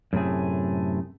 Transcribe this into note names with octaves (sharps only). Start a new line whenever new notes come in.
F#2 A2 C3 A3 G#4